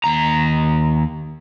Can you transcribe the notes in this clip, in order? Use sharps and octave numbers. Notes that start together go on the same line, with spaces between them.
D#2 A#5